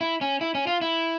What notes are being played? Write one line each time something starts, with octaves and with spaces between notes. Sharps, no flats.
E4
C#4
E4
C#4
F4
E4